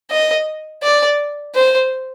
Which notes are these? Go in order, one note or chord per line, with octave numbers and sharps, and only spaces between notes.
D#5
D5
C5